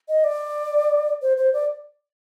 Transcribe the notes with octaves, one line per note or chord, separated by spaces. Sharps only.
D#5
D5
C5
C5
D5